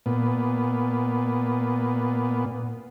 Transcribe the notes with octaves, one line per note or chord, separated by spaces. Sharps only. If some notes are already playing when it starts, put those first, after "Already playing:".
A#2 B3